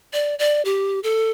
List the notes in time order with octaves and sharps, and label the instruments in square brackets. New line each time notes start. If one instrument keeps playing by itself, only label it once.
[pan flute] D5
D5
G4
A4